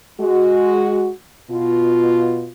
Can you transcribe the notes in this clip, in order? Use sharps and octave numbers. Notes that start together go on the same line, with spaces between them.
G#3 F#4
B2 F4